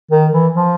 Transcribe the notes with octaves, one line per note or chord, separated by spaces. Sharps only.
D#3
E3
F3